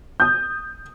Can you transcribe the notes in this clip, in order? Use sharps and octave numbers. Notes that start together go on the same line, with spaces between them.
D#6 G6